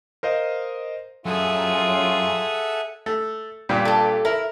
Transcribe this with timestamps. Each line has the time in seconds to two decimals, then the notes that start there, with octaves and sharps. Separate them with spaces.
0.23 A#4 C5 D#5 F5
1.26 F#2 F4 G#4 A4 E5 F#5
3.06 A3
3.69 G2 A#2 G3
3.85 G4 A4
4.25 E4 A#4